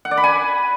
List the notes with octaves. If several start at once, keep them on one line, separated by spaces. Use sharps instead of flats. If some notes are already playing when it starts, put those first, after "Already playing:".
F#5
D5
B5
G#5